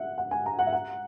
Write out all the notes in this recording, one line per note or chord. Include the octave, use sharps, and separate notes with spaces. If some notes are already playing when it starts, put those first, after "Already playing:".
Already playing: E5 F#5
F#5
G#5
A#5
F#5
E5
F#5